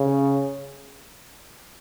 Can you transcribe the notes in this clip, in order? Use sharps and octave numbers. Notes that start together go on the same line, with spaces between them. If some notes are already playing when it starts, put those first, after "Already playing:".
Already playing: C#3